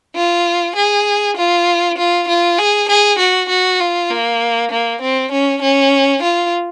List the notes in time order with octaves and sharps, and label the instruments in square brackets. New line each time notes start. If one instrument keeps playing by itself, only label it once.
[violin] F4
G#4
F4
F4
F4
G#4
G#4
F#4
F#4
F4
A#3
A#3
C4
C#4
C#4
F4